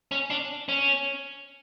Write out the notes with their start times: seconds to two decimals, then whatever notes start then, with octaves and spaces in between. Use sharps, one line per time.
0.11 C#4
0.30 D4
0.69 C#4